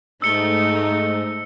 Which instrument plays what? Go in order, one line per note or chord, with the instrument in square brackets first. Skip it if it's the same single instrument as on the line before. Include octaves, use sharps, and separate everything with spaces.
[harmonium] G#2 [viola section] A3 D#4 [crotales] E6 C#7 G7